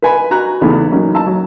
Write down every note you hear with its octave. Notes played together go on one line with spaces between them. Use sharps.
B4 G#5 B5
F#4 A#5 F#6
E2 C#3 A3 B3 D#4 B5
F#3 A#3 C#4 D#4
A5 A#5 E6
F#3